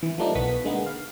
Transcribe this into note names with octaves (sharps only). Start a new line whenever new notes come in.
E3
F3 G3 A3 A#3 D4 D#4
B1 B3 B4 C#6 D#6 B6
D3 G#3 A#3 B3 D#4
F5